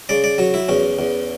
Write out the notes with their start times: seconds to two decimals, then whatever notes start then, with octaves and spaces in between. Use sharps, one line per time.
0.09 C#3 D5
0.24 D5
0.38 F#3 C#5
0.54 E4
0.68 E2 C#4
0.99 E2